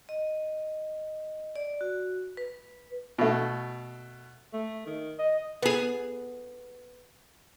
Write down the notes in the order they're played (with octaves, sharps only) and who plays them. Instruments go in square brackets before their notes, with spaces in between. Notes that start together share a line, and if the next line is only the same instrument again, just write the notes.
[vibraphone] D#5
D5
F#4
B4
[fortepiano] B2 A3
[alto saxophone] A3
D#3
D#5
[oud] B3 G#4